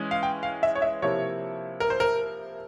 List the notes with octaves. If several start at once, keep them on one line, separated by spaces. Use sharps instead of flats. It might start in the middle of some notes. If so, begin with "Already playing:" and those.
Already playing: E3 G#3 C#4
F5
G5
F5
E5
C#5
E5
C3 F3 A#3 E4 C#5
A#4
C5
A#4